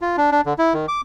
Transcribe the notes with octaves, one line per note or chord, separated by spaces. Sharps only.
F4
D4
D4
D3
E4
D#3
D6